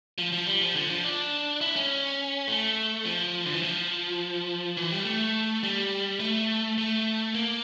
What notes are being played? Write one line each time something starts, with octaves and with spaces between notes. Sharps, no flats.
F3
F3
G3
F3
D3
F3
D4
E4
C#4
A3
F3
D3
E3
F3
E3
G3
A3
G3
A3
A3
A#3